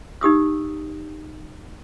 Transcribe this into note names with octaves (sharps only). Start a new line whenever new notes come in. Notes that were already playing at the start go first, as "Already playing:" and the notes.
D#4 G4 D#6 E6